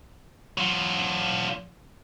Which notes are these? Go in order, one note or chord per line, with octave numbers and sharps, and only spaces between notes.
F#3 F4